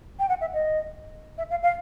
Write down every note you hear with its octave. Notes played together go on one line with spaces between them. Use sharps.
G5
F#5
E5
D#5
E5
F5
F5